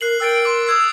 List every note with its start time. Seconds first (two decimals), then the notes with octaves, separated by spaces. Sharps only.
0.01 A#4 F#6 C7 F#7
0.20 A#4 G5 E6 A6 D7
0.45 C6 D6
0.67 D#6 E6 G#6 C7